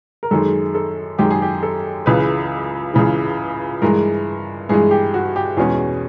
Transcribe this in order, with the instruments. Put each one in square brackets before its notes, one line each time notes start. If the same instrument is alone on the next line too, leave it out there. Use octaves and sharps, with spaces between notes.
[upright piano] A#4
F#2 D#3 G#3 A4
A4
F#2 D#3 G#3 G4
G#4
G4
A4
C#2 C#3 E3 B4
C#2 C#3 E3
G2 E3 G#3 A#4
G2 E3 G#3 G#4
G4
F#4
G4
E2 B2 G#3 C#4 G#4